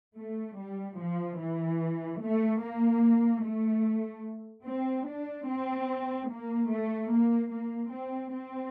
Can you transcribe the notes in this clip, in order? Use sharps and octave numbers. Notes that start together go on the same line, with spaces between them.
A3
G3
F3
E3
A3
A#3
A3
C4
D4
C4
A#3
A3
A#3
A#3
C4
C4